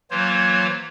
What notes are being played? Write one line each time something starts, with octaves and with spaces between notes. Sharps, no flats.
E3 F#3 A#3 F4 C5 C#5